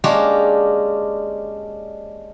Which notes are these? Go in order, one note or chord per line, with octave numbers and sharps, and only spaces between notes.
G#3 A#3 C#4 D4 G4 G#4